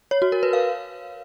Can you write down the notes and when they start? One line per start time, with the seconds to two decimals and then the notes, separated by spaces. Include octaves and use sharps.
0.11 C#5
0.22 F#4
0.32 A#4
0.43 B4
0.53 F5